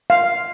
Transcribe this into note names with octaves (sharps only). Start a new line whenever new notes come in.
F5